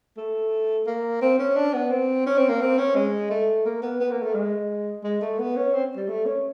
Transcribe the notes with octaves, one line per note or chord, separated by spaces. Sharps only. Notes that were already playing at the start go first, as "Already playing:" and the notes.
A3
A#3
C4
C#4
D4
B3
C4
C#4
C4
A#3
C4
C#4
G#3
A3
A#3
B3
B3
A#3
A3
G#3
G#3
A3
B3
C#4
C4
G3
A3
C#4